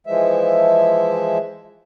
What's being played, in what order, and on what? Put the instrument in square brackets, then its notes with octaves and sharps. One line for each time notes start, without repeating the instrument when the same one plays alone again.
[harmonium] E3 F3 G#3 E5